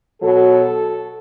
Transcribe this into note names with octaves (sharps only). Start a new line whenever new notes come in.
B2 F#3 A4